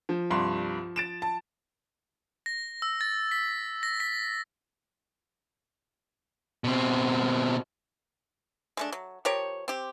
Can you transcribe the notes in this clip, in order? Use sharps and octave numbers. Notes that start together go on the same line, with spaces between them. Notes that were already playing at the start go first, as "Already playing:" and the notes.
F3
C2 G2 C6
A6 D7 E7
A5
A#6
E6
A6
B6
A#6
B6
B2 C4
G#3 A3 D4
F#3
F3 G4 A#4 C#5
C4 G4